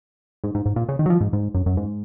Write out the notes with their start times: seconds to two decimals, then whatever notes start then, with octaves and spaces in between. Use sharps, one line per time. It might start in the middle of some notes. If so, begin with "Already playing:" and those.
0.44 G#2
0.55 G#2
0.66 G#2
0.76 A#2
0.88 C#3
0.99 D#3
1.06 F#3
1.10 F3
1.21 G#2
1.33 G#2
1.54 F#2
1.66 F#2
1.77 G#2